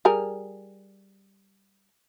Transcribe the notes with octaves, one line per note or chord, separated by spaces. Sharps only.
G3 G#4 A#4